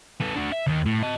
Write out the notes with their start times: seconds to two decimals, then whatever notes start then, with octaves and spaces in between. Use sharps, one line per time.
0.20 B3 A4
0.35 D4 F#4
0.52 E5
0.67 D#2 D#3
0.86 A2
1.03 D#5 A5